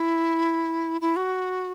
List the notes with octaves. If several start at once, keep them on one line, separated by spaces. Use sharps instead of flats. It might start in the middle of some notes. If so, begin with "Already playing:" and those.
Already playing: E4
E4
F#4